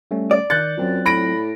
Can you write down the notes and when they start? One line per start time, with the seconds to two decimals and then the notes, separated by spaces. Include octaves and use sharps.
0.11 G3 A3 C#4
0.31 D5
0.50 D#3 F#6 G6 A6 C#7
0.77 F#2 F#3 C4 F4
1.06 A2 B5 A#6 D7